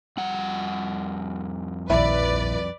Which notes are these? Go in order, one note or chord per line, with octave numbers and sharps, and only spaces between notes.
F2 G3 F#5
A#1 D#2 E4 B4 D5